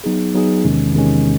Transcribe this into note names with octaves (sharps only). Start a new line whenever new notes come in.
F#3 B3 D#4 G#4
F#3 B3 D#4 G#4
E2 C3 D#3 G#3 C#4
E2 C3 D#3 G#3 C#4